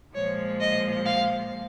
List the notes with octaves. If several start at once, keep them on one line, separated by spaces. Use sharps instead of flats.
A#2 F3 G#3 C#5
D#5
F5